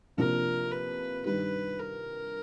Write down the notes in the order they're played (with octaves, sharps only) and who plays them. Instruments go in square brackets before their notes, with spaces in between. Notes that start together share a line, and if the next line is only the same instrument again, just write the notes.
[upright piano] C3 F3 A#3 D4 F4 [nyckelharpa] A#4
[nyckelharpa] B4
[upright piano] G2 D#3 G3 [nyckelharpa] B4
[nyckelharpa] A#4